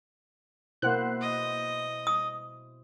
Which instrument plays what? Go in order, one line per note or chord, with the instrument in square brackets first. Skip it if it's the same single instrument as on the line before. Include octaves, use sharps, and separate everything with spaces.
[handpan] B2 E4 C5 [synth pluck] A#3 F#5 F#6
[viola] D#5
[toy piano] D#6